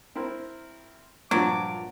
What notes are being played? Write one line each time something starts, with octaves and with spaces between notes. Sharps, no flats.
C4 E4 A#4
G2 A#2 F3 F#3 D6